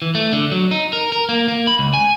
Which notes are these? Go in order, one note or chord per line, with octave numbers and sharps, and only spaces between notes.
E3
A3
D3
F#3
D#4
A#4
A#4
A#3
A#3
B5
C#2
G#5